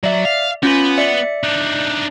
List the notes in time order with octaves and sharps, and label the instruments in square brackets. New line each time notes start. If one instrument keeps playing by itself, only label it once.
[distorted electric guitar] F#3 [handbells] D5 E5
[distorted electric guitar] F5
[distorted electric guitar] B3 B4 [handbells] C#4 F4
[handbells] D5 E5 C#7
[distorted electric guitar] D4 D#4